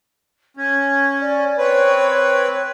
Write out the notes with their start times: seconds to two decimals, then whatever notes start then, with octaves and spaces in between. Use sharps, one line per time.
0.57 C#4 G#6
1.20 D5
1.58 C4 B4 C#5